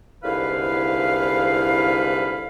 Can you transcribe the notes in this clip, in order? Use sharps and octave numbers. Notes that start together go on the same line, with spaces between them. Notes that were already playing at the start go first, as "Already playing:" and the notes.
C2 G#2 D3 E4 B4 F5